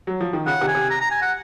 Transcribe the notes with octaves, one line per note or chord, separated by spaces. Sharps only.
F#3
F3
D#3
C#3 F#5
C3 D#3
G#5
C3
A#5
A#5
G#5
F#5